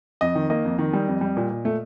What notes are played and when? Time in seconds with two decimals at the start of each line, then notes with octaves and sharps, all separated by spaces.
0.21 F2 D#5
0.35 D#3
0.50 A#3 D#5
0.64 F2
0.79 D#3
0.93 G3
1.08 F2
1.21 G3
1.37 A#2
1.50 A#2
1.65 A3